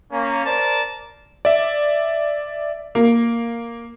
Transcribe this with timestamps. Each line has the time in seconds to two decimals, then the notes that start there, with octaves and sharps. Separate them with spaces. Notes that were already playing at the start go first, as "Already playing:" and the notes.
0.12 A#3 C#4
0.45 A#4 C5 D5 A5
1.45 D5 E5
2.95 A#3